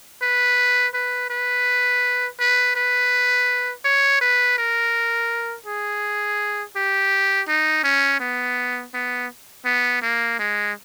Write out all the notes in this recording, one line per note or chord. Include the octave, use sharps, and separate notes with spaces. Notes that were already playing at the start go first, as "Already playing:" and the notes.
B4
B4
B4
B4
B4
C#5
B4
A#4
G#4
G4
D#4
C#4
B3
B3
B3
A#3
G#3